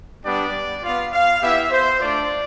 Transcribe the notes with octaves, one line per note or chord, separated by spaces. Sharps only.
G3 B3 D4 G4 D5
B3 F4 F5
F5
B3 E4 G4 E5
C5
A3 D4 F4 D5